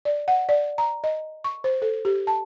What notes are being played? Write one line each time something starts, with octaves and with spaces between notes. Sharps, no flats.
D5
F#5
D5
A#5
D#5
C#6
C5
A4
G4
A5